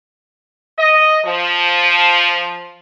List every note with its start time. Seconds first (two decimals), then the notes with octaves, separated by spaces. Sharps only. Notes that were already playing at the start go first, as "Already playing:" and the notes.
0.78 D#5
1.25 F3